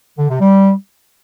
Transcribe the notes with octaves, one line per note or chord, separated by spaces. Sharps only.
D3
C3
G3